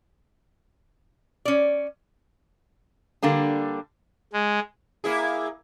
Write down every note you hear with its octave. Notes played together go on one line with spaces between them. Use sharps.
C#4 D5
D3 G3 A#3 D4
G#3
A#3 E4 G#4